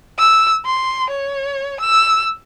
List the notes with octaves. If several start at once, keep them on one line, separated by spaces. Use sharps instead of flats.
E6
C6
C#5
E6